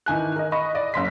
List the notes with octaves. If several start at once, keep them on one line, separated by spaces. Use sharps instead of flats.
D#3 E3 G#5 F#6
A#4 D#5
D#5 B5 C#6
D5 D#5
F#1 C#3 C6 B6